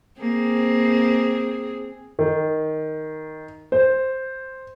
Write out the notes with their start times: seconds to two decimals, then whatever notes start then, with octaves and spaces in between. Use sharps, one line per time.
0.21 A#3 C4 G#4
2.19 D#3
3.72 C5